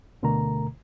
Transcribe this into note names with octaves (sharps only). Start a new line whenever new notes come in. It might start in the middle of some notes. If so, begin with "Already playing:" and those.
D2 B2 D3 A3 A#4 A#5